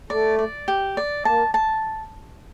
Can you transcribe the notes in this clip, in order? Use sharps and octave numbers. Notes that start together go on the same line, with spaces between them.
A3 D5
D5
G4
D5
A#3 A5
A5